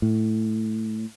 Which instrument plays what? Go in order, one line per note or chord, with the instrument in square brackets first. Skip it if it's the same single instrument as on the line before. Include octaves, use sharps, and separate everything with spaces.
[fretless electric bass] A2